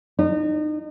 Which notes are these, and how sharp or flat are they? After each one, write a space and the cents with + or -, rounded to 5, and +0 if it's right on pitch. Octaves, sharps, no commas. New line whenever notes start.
D#4 -35